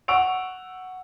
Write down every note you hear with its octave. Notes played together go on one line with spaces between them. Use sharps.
F#5 C#6 E6 D7 F7